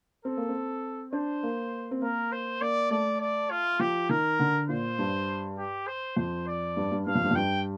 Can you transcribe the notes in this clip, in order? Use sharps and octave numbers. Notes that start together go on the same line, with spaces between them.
C4 A4
A#3
C4
D4 C5
A#3
C4
A#3 A#4
C5
A#3 D5
A3 D5
D5
F4
F3 G4
D#3 A#4
D3
A#2 C5
G2
G4
C5
F2 C5
D5
G2
G2
G2 F5
F2
G2
F2
G2 G5